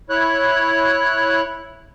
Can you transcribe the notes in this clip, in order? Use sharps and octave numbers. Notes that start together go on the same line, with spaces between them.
E4 C#5 F#6